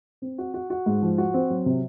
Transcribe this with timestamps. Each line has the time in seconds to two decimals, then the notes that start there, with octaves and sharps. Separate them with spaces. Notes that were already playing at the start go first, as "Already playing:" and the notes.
0.22 C4
0.38 F#4
0.54 F#4
0.70 F#4
0.86 G#2
1.02 F3
1.18 F#4
1.34 C4
1.50 F#3
1.66 C3